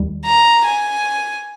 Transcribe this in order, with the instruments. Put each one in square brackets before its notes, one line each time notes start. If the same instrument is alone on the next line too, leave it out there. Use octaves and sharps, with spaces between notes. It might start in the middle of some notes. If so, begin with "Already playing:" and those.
Already playing: [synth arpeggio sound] D#2 D#3 G3
[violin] A#5
G#5